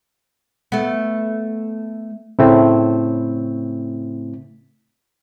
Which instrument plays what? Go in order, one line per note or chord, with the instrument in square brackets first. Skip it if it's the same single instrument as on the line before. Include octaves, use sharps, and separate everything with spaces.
[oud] A3 B3
[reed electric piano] A2 C#3 A3 C4 E4